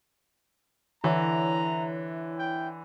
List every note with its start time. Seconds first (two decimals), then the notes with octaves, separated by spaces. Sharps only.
1.04 D3 E3 E4 C#5 E5 A#5
2.39 G5